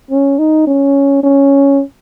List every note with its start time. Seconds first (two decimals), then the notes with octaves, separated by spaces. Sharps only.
0.11 C#4
0.39 D#4
0.67 C#4
1.23 C#4